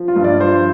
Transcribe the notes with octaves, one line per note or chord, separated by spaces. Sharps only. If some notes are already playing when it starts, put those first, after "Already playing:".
Already playing: F3
F4
G2
D5
F3 C5